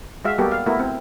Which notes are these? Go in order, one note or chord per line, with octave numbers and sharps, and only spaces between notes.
G#3 F#4 E5 F5
G3 A#3 B3 F#4 G4 A4
F5
A3 B3 E4 F#4 A#4
C4